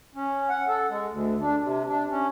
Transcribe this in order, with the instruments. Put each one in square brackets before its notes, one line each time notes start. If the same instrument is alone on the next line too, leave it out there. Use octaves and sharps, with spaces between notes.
[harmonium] C#4
F#5
A4
G#3
D2
D4
C3
D4
C#4